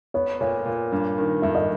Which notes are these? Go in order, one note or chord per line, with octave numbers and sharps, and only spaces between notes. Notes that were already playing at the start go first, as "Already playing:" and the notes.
B3 C#5
A#2 C#5
A#2
G2
D#3
G2 E5
D#5